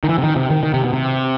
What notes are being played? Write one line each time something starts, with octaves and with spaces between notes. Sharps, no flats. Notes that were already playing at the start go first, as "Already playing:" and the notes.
D#3
E3
C3
D#3
C3
D#3
D#3
C3
B2
C3